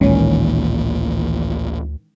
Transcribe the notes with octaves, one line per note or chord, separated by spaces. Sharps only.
A1 D2 A#2 D#3 E3 G#3 C#4